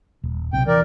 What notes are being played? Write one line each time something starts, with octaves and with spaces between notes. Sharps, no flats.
D#1
B1 C3 G5
E3 A#4 D5